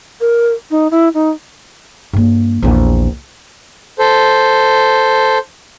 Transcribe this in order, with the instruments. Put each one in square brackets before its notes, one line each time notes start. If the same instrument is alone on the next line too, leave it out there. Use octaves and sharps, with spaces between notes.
[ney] A#4
D#4
E4
D#4
[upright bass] G2 A#3
A#1 E2
[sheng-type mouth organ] A4 C5